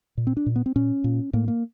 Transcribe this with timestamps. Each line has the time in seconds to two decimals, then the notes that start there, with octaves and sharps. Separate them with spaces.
0.17 A#2
0.27 C4
0.37 D4
0.46 A#2
0.56 B3
0.66 C4
0.76 A#2 C#4
1.04 A#2
1.33 A2 A#3
1.48 A#3